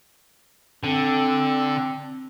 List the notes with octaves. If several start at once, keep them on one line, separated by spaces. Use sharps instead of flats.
D3 C4